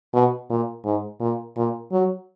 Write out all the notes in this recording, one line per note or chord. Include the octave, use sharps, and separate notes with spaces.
B2
A#2
G#2
A#2
A#2
F#3